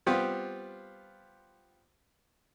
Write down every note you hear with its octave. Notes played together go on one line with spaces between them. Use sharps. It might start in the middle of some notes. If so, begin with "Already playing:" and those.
G3 B3 C4 F4 G4